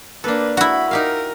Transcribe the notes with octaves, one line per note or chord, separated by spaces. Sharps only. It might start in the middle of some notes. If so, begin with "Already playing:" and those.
A#3 D4 A4 B4
E4 F#4 B5
D#4 G4 A#4 F5